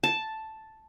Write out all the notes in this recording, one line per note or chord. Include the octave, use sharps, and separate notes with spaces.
A5